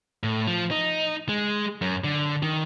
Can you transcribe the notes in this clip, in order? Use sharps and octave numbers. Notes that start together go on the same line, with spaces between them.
A2
F3
D#4
G#3
F#2
D3
D#3